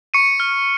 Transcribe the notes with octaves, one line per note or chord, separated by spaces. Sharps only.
C#6 C#7 D#7
F6